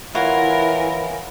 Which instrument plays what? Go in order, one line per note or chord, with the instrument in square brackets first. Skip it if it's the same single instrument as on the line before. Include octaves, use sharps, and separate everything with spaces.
[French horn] E3 [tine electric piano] E4 [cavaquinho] F4 C#5 F#5 [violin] A#4